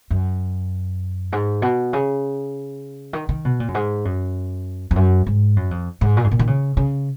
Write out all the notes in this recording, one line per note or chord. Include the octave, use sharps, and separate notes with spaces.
F#2
G#2
B2
C#3
D#3
D#3
B2
A#2
F#2
G#2
F#2
F2
F#2
G#2
F#2
F2
G#2
A#2
G#2
A#2
D#3
C#3
C#3